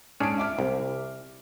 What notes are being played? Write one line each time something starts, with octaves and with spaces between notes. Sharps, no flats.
G#2 C#4 D4 G#4 D7
E5 D6 F6
C2